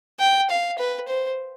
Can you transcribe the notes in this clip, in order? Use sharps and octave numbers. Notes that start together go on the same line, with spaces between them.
G5
F5
B4
C5